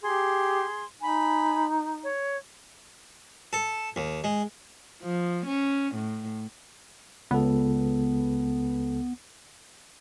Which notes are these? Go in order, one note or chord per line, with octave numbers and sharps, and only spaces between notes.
G4 G#4 C6
D#4 G#5 B5
C#5
A4
D#2
G#3
F3
C#4
A2
C#2 B3 A4